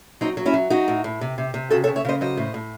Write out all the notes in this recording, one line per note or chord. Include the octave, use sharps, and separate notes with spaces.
F#3 C4 D#4
F#3
C#4 E4
F#3
F#3 D#4 F#4
A2
A2
C3
C3
C3
C#3 F#4 A4
A4 C#5
C#3
C#5 E5
C#3 C5 D#5
F#3 C5 D#5
A2
A2